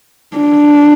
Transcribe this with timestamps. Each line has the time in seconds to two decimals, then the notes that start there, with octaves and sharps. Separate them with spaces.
0.38 D4